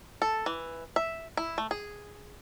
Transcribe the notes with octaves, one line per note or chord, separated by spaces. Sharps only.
A4
E3
E5
E4
A3
G#4